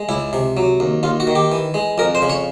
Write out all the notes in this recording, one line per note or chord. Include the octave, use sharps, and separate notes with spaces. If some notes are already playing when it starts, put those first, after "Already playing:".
Already playing: G#3
C#2 E4
C3
F#3
D#2
D#2 F4
F#4
D#3
G4
E3
G#3
F2 A#4
C5
C#3
C#5